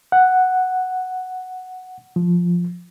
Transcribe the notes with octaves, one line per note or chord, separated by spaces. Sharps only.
F#5
F3